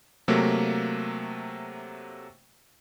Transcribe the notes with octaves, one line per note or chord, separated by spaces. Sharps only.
C3 F#3 A3 A#3